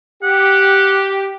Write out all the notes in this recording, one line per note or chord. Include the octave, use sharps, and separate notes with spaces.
G4 F#5